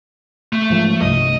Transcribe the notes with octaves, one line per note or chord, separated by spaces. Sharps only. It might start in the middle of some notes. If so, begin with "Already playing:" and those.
A3
G#2 F3
C2 G2 D#5